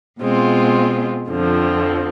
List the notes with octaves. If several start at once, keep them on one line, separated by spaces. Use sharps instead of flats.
B2 G#3 C4 F4
F2 D3 F3 C4